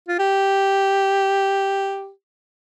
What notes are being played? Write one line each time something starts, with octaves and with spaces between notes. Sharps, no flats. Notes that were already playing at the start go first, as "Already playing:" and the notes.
F4
G4